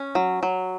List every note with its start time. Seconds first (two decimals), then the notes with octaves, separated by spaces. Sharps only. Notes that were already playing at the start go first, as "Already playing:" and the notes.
Already playing: C#4
0.15 F#3
0.43 F#3